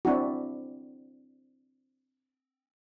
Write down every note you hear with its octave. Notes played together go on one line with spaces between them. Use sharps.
C4 D4 E4 F#4